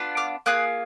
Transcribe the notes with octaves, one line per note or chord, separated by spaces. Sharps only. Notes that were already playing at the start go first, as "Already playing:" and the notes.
Already playing: B3 D4 F4
D6 F6
A#3 F4 G#4 D#6 F#6